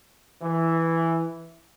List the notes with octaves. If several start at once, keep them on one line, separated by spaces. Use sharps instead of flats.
E3